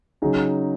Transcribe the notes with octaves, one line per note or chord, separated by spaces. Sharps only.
C#3 F#3 D#4 G#4